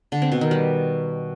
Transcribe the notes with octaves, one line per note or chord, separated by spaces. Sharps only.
D3
C4
B2
D#3
G3